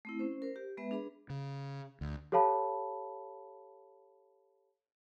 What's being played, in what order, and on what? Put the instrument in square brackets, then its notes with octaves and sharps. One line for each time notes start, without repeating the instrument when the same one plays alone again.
[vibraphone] A3 C4 E4
C#4 C5
A#4 C5
G4
G#3 B3 B4 E5
D4 G#4 B4 B5
[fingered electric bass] C#3
D2
[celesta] G4 A4 C#5 F5 A5 B5